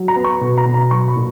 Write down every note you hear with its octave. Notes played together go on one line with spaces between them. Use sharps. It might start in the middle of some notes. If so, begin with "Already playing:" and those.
Already playing: F#3
A#5
B3
C#6
B2
A#5
B2
A#5
F#3 C#6
B5
A#2